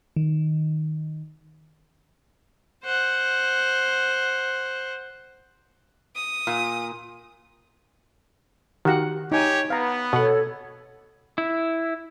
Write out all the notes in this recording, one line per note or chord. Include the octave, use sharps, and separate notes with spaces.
D#3
C5 F#5
D#6
A#2
D#3 F#4 G4 F5 F#5
D#4 G4 C#5 G#5
B3 F5 A#5
B2 A4 C#5 F#5
E4